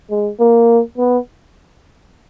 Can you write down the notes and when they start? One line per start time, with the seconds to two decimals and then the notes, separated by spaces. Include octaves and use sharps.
0.10 G#3
0.39 A#3
0.98 B3